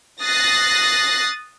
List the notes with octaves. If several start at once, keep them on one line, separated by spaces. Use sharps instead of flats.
D#6 F#6 A6 A#6 C7